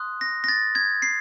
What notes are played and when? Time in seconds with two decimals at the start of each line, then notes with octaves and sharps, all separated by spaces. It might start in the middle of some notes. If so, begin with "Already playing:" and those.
Already playing: C6 D#6 F#6
0.21 A#6
0.44 A#6
0.48 A6
0.75 G#6
1.02 C7